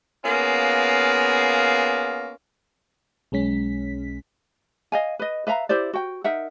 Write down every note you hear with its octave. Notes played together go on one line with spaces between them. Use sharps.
A#3 B3 C#4 F4 G#4
B1 G#3 C#4 B6
D#5 F5 G#5
B4 D#5
B4 E5 F5 A#5
E4 G4 C5 D5
F#4 G5
D#4 A#4 E5 F#5